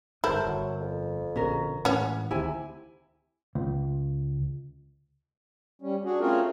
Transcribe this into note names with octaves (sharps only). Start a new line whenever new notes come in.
G1 G#2 E4 A4 A#4 C5
G1 F#3
F2
A#1 B2 D3 C#4 A#4
A2 E3 G#3 C#4 C#5 F#5
D2 C3 D#3 A3 E4 G#5
C#2
G3 C#4
D4 F#4 G#4
A3 C4 C#4 F4 G#4 A#4